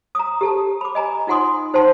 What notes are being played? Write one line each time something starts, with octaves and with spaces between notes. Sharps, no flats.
A#5 D#6
G4 A4 A5
B5 D6
D#5 G#5 A#5
D#4 F4 F#5 G#5 C6 D#6
D#4 C5 F#5 G5 A5 C6